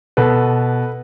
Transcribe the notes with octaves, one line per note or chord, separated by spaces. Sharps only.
B2 A4 B4